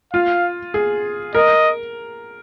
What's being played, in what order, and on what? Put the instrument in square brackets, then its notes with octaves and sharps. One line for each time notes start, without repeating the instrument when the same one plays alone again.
[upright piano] F4 [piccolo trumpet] F5
[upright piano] G#4
[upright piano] A#4 [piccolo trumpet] D#5